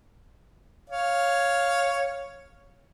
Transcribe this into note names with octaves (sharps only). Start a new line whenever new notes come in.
C#5 F5